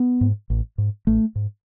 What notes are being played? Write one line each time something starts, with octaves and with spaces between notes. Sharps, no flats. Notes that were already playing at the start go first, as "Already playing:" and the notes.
Already playing: B3
G#2
A1
G#2
A1 A3
G#2